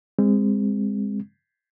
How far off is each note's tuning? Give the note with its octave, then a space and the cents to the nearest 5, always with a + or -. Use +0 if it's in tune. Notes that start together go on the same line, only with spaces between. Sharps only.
G#3 -25 C4 +0